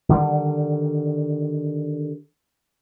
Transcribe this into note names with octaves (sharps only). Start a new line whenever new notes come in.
D3 D#3 G3